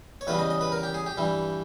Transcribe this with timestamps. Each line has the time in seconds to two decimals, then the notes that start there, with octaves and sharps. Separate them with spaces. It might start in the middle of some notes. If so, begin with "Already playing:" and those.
0.21 C#5
0.27 E2 C#3 G3 B4
0.39 D#5
0.50 D#5
0.61 B4
0.72 A#4
0.83 G4
0.94 G#4
1.06 G4
1.17 G2 E3 G3